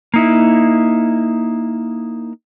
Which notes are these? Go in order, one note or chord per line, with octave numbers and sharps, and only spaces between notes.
A#3 D#4 E4